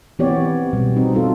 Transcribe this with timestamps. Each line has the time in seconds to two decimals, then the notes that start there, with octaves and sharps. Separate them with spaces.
0.19 E3 B3 C4 G4 C#5 D5
0.73 B2 G3
0.96 C4 D#4
1.13 G3 D#4 F4 A4